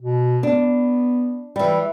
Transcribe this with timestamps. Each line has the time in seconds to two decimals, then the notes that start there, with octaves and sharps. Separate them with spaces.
0.01 B2
0.43 B3 D4
1.56 E3 G3